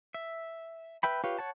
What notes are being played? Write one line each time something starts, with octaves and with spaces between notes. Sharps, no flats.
E5
B4 E5 G5 B5
F4 G4 B4 C#5 F5
C#5 F#5 A5